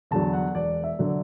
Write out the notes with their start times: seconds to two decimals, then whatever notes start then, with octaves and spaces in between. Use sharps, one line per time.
0.11 E2 D3 F#3 A5
0.33 F#5
0.54 E1 D5
0.84 E5
0.99 D3 F#3